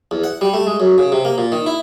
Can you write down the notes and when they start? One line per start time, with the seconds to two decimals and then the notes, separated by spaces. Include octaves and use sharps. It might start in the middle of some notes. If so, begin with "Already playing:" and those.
0.11 E2
0.24 F#5
0.41 G3
0.53 A3
0.67 G#3
0.80 F#2
0.98 C#3
1.12 C3
1.25 A#3
1.38 A#2
1.52 D#3
1.66 E4